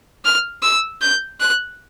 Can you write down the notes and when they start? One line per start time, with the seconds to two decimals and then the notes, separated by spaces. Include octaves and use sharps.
0.25 F6
0.63 E6
1.02 G6
1.40 F#6